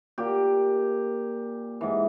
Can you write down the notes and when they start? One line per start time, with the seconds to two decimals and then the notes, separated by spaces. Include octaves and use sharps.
0.18 A#2 G4
1.81 G#2 E3